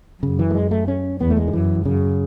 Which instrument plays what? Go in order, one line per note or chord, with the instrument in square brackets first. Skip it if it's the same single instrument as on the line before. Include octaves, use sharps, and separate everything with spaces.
[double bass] F#2 [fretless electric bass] C#3
[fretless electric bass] E3
A3
G#3
A3
C#4
[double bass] E2 [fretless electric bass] B3
[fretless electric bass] A3
G#3
D#3
[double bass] F#2 [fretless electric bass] E3
[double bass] F#2 [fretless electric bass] C#3